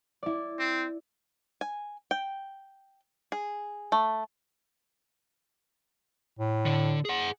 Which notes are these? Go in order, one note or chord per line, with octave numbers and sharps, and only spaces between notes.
E4 D5
C4
G#5
G5
G#4
A3
A2
D3
G#4 F#5